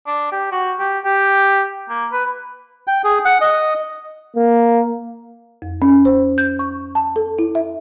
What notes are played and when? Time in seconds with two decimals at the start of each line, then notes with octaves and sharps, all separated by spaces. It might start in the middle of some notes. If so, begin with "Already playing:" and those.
0.07 D4
0.32 G4
0.52 F#4
0.79 G4
1.05 G4
1.89 A#3
2.12 B4
2.87 G5
3.04 G#4
3.25 F#5
3.41 D#5
4.36 A#3
5.62 F2
5.82 C#4
6.05 C5
6.38 G6
6.59 C#6
6.95 A5
7.16 A4
7.39 E4
7.55 E5